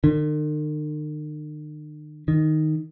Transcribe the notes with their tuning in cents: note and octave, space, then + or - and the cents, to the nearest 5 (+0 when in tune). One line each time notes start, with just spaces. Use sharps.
D#3 -45
D#3 +0